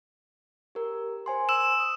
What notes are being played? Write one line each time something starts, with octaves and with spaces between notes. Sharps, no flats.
G4 A#4
C5 G#5 C6
E6 E7
D#6